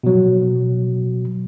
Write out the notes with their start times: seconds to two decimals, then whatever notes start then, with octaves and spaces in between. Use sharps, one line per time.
0.03 B2 F#3